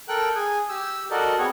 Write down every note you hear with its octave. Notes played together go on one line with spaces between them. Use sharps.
A4 A#4 G5 F#6
G#4 G#5
G4 E6
F#4 A4 A#4 D5 D#5
B3 C4 G#4 C#5